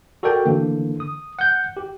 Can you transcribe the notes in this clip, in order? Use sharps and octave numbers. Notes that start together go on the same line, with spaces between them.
F#4 A4 A#4 D5 G5
D3 E3 A#3
D#6
F#5 G6
G4